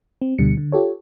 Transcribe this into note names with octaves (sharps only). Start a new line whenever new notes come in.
C4
D2 B2 D3 G3 C#7
D3
F4 G4 A4 C#5